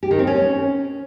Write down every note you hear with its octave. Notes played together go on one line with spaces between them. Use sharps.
G4
D#3
C4
C#4